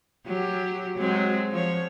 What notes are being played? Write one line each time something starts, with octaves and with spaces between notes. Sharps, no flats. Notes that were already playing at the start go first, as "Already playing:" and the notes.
F#3 G4
F#3 G#3 C4
F3 C#5